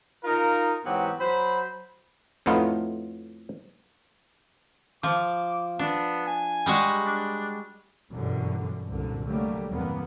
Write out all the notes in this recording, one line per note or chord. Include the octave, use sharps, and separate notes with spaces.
D#4 F4 A#4
G#2 E3 F#3 B3 C4 G4
F#3 C5 B5
F2 A2 A3 B3 D#4 F4
F3 D6
B3 D4
G#5
G3 G#3 F#4
D4
G1 F#2 B2 D3 E3 G3
C2 F#2 A#2 D3
D3 F#3 G3 A3 A#3
E2 G2 C3 A#3 B3